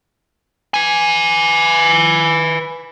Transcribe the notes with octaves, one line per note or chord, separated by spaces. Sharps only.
B4 G#5